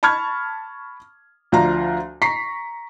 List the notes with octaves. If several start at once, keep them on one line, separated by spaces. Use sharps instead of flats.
A5 B5 C#6 F6 G#6
D2 F3 D5 F5 A#5
A#5 C#6 B6 C7